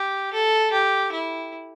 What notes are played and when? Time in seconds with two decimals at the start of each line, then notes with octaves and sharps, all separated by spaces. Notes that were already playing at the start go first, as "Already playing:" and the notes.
Already playing: G4
0.33 A4
0.72 G4
1.12 E4